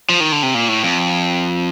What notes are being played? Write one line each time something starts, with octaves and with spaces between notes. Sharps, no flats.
F3
D#3
D3
C3
A#2
A2
F2